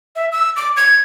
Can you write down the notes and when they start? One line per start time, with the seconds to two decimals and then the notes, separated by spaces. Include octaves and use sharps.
0.16 E5
0.32 E6
0.56 D6
0.77 G#6